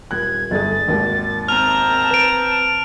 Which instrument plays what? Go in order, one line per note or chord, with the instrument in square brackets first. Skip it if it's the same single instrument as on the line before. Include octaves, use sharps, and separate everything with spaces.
[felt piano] D#1 F#6 [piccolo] G#6
[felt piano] G1 A3 G#4 [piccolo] A6
[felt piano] G#1 D#2
[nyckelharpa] C4 A#5 [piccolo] A5 [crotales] F6 F7
[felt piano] B4 [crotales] D7 F7